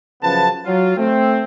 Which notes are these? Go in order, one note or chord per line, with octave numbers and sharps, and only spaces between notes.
F#2 C#3 F3 B3 B4 A5
F#3 F4
A3 C4